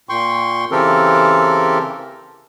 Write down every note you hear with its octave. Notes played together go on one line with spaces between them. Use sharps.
A#2 G5 C6 C#6
C#3 E3 C4 G4 A4 A#4